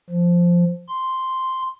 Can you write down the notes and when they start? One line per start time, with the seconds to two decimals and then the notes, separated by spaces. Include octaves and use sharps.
0.10 F3
0.88 C6